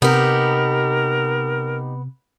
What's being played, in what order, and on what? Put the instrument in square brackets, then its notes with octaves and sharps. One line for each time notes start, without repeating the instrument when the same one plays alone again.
[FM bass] C3 [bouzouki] B3 [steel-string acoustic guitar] D#4 G4 [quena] A#4